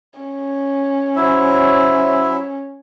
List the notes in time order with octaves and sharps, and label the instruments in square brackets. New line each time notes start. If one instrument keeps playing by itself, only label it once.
[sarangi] C#4
[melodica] F#3 E4 E5 [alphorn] C5